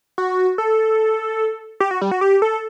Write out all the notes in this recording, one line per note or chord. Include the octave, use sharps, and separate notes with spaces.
F#4
A4
G4
F#4
G3
F#4
G4
A4